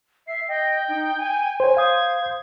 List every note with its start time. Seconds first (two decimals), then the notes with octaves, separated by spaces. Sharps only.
0.27 E5 C7
0.48 D#5 G5
0.88 D#4
1.18 G#5
1.60 C5 C#5 G#5
1.77 C5 F5 D#6 G#6